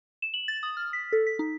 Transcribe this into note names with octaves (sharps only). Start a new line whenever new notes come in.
E7
F#7
A6
D#6
F6
B6
A4
B6
D#4